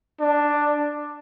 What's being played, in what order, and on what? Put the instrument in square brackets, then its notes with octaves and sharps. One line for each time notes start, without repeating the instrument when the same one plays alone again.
[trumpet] D4